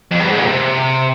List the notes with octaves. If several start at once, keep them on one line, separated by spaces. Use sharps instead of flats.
F2
G2
G#2
A#2
C3